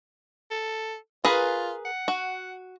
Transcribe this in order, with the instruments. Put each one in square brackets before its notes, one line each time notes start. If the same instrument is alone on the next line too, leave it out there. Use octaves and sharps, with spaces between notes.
[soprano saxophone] A4
[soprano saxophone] F4 [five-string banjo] G#4 A#4 B4
[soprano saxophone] F#5
[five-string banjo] F#4